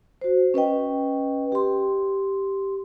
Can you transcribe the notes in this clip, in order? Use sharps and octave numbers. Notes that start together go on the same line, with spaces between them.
F#4 C5
C#4 B4 D#5 G5
G4 C6